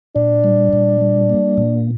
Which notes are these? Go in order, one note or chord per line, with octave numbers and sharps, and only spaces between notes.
A#2 D4
G3
A#2
G3
A#3
A#2